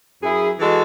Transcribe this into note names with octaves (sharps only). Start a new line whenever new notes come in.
F#2 E4 G#4
E3 G#3 F#4 A4